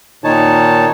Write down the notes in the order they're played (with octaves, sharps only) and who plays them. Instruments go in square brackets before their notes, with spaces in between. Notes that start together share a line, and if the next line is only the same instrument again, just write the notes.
[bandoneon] A#2 D#3 D#4 C#5 A5